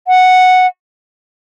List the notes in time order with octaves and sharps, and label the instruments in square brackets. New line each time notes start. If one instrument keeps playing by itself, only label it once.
[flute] F#5